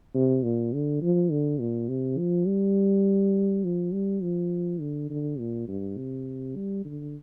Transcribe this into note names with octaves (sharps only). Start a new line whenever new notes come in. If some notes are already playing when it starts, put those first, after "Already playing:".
C3
A#2
D3
F3
D3
A#2
C3
F3
G3
F3
G3
F3
D3
D3
A#2
G2
C3
G3
D3